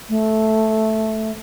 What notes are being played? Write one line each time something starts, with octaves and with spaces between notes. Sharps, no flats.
A3